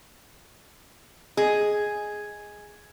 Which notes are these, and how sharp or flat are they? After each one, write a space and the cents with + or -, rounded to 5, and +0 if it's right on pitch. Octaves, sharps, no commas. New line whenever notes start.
G#4 +0 D#5 +5